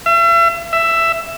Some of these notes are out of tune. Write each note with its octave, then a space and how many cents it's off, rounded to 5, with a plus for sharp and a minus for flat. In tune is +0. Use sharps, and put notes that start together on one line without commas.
E5 +40
E5 +10